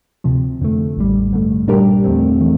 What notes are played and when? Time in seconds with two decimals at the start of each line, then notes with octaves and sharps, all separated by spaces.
0.24 D2 C3 F3
0.61 F2 D3 A3
0.97 A1 A2 G3
1.32 G2 D3 A3
1.67 A#2 G3 D4 G4 A#4
2.04 E2 D3 F3 A3 C4
2.40 E3 A3